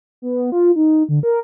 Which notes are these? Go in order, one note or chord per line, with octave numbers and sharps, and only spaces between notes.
B3
F4
D#4
D3
A#4